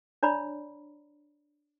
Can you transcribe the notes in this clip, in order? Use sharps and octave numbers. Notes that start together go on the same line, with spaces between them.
D4 C#5 D5 A#5 B5